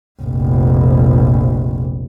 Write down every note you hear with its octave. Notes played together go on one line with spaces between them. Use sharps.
F1 A#1